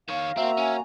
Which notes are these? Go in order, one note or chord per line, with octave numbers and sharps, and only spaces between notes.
D#3 C#5 F5
A#3 C4 F#4 E5 A#5
C#4 G#5